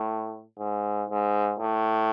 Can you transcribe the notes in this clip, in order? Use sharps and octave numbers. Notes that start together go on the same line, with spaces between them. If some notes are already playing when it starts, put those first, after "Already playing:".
Already playing: A2
G#2
G#2
A2